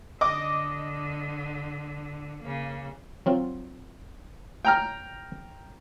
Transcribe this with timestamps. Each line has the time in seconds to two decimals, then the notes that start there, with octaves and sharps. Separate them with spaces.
0.21 D3 D#5 D6
2.42 C#3 A#3
3.26 F#3 C4 F4
4.65 G5 A#5 F6